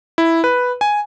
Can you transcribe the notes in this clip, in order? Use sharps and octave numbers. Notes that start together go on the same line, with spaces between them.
E4
B4
G#5